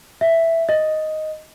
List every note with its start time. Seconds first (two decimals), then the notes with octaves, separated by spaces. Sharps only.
0.21 E5
0.69 D#5